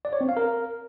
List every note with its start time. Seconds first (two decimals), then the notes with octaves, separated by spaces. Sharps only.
0.05 D5
0.13 C#5
0.21 C4
0.29 F5
0.37 A#4